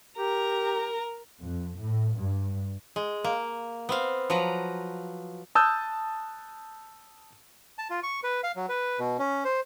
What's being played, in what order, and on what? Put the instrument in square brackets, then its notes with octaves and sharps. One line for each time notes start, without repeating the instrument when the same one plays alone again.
[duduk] G4 [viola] A#4 A#5
[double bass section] F2
A2
G2
[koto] G#3
A#3
B3 C4 F5
F3 F#3 B4 A#5
[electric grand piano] A5 D#6 E6 F#6 G6
[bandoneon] A5
F4
C#6
B4
F5
F#3
B4
B2
C#4
C5